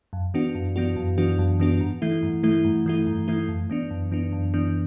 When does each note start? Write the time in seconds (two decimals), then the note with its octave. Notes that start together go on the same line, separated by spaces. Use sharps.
0.13 F#2
0.34 E3 B3 D4 F#4
0.55 F#2
0.76 E3 B3 D4 F#4
0.96 F#2
1.18 E3 B3 D4 F#4
1.39 F#2
1.60 E3 B3 D4 F#4
1.80 G2
2.02 E3 A3 E4
2.23 G2
2.43 E3 A3 E4
2.64 G2
2.86 E3 A3 E4
3.07 G2
3.28 E3 A3 E4
3.48 F#2
3.70 E3 B3 D4
3.90 F#2
4.11 E3 B3 D4
4.32 F#2
4.54 E3 B3 D4